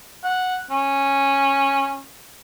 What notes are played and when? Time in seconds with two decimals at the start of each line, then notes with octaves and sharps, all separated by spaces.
0.24 F#5
0.70 C#4